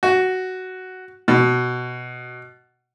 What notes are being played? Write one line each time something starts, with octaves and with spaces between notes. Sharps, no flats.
F#4
B2